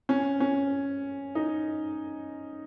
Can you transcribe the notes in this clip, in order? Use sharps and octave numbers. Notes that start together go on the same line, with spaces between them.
C#4
C#4
D#4